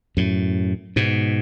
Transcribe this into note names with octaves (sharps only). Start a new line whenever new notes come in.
F#2 A2
G#2 B2